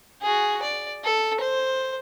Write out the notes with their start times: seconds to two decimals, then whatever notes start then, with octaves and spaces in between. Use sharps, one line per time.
0.22 F#4 G#4
0.62 D5
1.04 A4
1.40 C5